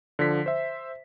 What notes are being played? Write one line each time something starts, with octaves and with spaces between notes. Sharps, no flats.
D3 F3 B6
C5 E5